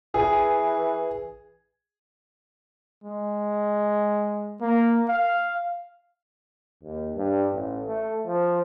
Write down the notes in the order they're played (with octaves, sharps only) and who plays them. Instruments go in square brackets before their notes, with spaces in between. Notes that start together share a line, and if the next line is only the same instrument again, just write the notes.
[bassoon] E3 [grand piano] G#4
[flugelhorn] G#3
A#3
F5
[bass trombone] D#2
G2
A1
A3
F3